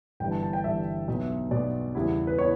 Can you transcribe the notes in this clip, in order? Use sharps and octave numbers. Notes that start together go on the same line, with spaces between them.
G1 G2 E3 G3 D4 G5
A5
A5
G5
G1 G2 E3 G3 D4 E5
B1 B2 F#3
B1 B2 F#3 D5
E2 C#3 G3 B3 E4
B4
B3 E4 C#5